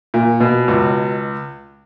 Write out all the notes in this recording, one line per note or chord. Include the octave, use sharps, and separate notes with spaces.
A#2
B2
C#2